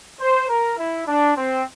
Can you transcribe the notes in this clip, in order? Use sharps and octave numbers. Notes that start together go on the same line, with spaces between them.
C5
A#4
E4
D4
C4